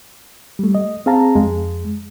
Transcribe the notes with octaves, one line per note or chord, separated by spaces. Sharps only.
G3 A3
D#5
C4 G#4 F5 A5 A#5
F2 G#3